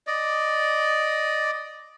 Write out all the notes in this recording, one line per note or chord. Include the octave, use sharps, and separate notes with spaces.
D5 D#5